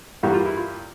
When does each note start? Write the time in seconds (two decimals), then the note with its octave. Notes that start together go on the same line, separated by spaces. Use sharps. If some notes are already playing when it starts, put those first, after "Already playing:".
0.23 G2 E3 G3 A#3 F#4
0.34 F4
0.45 E4
0.57 F4